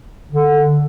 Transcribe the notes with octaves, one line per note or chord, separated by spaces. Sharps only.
D3